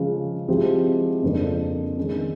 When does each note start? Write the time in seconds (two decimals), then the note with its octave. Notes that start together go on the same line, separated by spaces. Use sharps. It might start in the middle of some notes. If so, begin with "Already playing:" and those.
Already playing: C#3 F3 G#3
0.48 F3 G#3 C4 E4 G4
1.23 F2 C#3 F3 A#3 D4
1.98 D#3 G#3 C#4